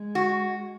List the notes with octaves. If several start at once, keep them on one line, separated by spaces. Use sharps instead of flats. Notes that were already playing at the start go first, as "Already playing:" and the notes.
Already playing: G#3
F#4